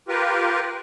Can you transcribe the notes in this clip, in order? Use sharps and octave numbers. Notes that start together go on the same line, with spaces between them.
F4 G4 A#4 B4